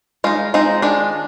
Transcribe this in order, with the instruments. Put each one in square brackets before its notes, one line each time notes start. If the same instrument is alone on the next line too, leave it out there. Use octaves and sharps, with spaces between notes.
[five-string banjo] G#3 D#4 F4
G#3 C4 D#4 F4
D#3 G#3 D4